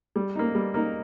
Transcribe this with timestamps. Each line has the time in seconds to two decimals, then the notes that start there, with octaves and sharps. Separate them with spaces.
0.16 G3
0.35 A#3 D#4
0.55 G3
0.74 A#3 D#4